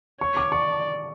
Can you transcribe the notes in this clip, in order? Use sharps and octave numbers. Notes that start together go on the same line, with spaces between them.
C#5 C#6
D6
D5 C#6